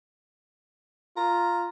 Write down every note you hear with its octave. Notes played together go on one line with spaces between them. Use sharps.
F4 A#5